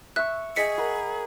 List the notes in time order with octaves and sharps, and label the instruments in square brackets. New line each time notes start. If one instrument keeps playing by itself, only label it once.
[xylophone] E5 F#6 [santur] C#6 E6
[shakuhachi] G#4 [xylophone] D#5 B6 C#7 [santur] G5
[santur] A#4 F#5 B5